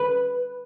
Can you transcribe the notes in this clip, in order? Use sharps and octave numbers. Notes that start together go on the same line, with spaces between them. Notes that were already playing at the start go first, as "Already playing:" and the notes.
Already playing: B4